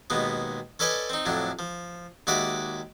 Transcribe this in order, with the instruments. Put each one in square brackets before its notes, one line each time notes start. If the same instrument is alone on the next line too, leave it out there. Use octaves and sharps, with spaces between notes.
[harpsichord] D#2 B2 G#3 B3
C#4 A4 B4 D5 D#5 G#5
C4 D#4
F2 A2 F#3 D4
F3
D#2 G#3 F#4 D5 E5 D6